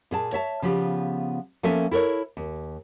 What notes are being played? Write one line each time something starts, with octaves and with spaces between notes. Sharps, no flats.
A#2 G#4 A5
C#5 E5 A5
C#3 F3 B3 G4
F3 A#3 B3 C#4 A4 E5
E4 A4 A#4 C#5
D#2